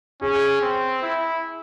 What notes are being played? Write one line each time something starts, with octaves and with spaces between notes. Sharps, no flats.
C#4 G#4
C4
E4